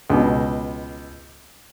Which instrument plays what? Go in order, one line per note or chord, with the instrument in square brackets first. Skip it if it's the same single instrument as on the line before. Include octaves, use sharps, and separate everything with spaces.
[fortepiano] C#2 B2